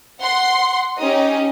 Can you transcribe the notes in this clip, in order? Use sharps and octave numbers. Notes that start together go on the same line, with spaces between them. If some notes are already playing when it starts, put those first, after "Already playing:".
F#5 C6
C#4 D#4 G4 D#5